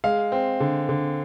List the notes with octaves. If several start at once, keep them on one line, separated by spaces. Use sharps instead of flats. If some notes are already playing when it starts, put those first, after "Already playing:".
G#3 F5
C4
D3
D3